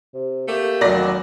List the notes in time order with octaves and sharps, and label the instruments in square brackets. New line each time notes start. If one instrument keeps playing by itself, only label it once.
[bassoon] C3
[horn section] A3 G4 [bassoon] A#3
[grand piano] F1 F#3 [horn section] D3 D#3 [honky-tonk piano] D5 A#6